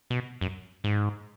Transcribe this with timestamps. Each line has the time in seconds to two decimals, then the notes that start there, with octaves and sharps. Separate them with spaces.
0.10 B2
0.41 F#2
0.84 G#2